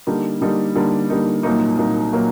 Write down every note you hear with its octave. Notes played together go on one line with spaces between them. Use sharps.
D3 G3 A#3 D#4
D3 G3 A#3 D#4
D3 G3 A#3 D#4
D3 G3 A#3 D#4
C2 A#2 F#3 A#3 D#4
C2 A#2 F#3 A#3 D#4
A#2 F#3 A#3 D#4